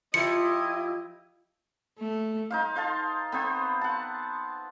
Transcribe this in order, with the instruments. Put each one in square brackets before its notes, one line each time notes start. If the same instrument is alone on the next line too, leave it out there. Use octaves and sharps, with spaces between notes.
[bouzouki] F3 F4 G4 [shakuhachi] E4 [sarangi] D#5 [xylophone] C#7
[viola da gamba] A3
[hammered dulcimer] D#4 C5 F5
C5 F5 A5 C6
B3 C4 C5
F#5 A5